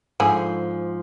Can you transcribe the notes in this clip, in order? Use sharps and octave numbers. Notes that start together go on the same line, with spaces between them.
G#2 D3 F3 E4 G#4